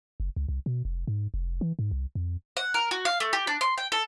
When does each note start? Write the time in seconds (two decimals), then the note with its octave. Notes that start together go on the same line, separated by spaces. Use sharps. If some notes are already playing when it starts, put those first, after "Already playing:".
0.20 F#1
0.36 C#2
0.49 C2
0.66 B2
0.85 F1
1.07 G#2
1.34 F1
1.61 E3
1.79 G#2
1.91 C2
2.15 F2
2.57 F#5
2.74 A#4
2.91 F#4
3.05 F5
3.20 A3
3.33 G4
3.47 D4
3.61 C6
3.78 G5
3.92 A4